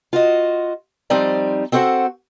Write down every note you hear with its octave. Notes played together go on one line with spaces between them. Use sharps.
F4 F#4 D#5
F3 G3 C4 D#4 D5
C4 F#4 A4 C5 F#5